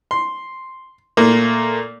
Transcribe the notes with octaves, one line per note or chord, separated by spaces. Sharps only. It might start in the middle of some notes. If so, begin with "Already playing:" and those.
C6
A#2 A3 A#3